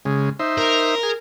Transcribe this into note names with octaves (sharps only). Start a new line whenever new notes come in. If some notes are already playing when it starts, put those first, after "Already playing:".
C#3 G#3
D#4 C5 E5
A#4
G#4